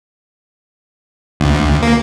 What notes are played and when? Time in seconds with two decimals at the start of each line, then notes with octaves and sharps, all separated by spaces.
1.40 D2
1.82 A#3